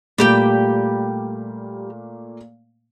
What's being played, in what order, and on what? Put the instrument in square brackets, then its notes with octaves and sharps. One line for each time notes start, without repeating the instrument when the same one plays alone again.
[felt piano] A#2 A3 A#3 [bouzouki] G3 G4 G5